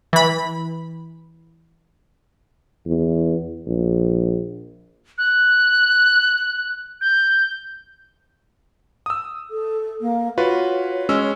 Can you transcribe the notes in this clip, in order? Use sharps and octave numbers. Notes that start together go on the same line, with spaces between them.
E3 B5
E2
A#1
F#6
G6
D#6 E6
A4
A#3
F4 F#4 B4 C#5
G#3 C#4 E6